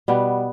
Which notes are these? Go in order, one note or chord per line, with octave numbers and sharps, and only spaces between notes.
B2 G3 B3